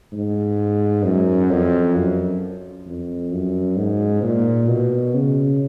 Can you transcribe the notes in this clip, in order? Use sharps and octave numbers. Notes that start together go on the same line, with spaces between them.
G#2
F#2
F2
F#2
F2
F#2
G#2
A#2
B2
C#3